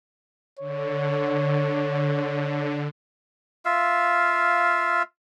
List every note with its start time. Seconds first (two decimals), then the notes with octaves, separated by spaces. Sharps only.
0.59 D3 C#5
3.65 F4 E5 F5